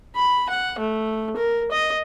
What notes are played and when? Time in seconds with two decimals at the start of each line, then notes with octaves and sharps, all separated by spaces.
0.16 B5
0.50 F#5
0.79 A3
1.36 A#4
1.72 D#5